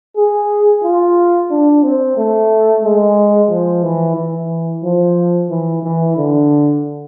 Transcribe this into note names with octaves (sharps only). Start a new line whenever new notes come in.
G#4
F4
D4
C4
A3
G#3
F3
E3
E3
F3
E3
E3
D3